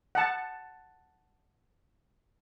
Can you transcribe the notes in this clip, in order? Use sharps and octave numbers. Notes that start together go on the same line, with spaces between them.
F#5 A5